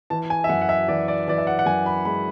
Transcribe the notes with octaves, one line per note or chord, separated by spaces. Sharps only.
E3 A5
G#5
E5
F#2 F#5
F#5
E5
E3 D5
D5
E3 D5
E5
F#5
F#5
F#2 G#5
B5
G#3 B5